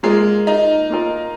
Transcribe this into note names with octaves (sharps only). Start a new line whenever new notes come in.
G#3 A#3 F4 A#4 D#5
D#4
A#3 F4 A#4 D#5